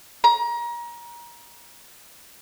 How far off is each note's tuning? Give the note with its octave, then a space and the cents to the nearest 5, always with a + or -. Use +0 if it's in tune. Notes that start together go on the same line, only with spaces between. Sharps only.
A#5 +30